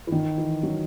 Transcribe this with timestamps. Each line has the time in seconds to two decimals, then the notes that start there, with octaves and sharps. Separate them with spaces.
0.07 E3
0.12 D#3
0.38 E3
0.63 F#3